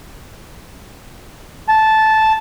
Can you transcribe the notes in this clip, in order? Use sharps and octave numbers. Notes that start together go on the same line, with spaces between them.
A5